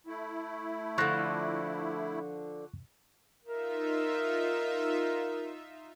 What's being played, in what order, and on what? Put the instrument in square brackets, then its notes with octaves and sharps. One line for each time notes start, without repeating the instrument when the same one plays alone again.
[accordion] A3 E4
[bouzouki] D3 F3 [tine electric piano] C#6 F#6 A#6
[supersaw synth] D#4 F4 E5 [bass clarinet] A#4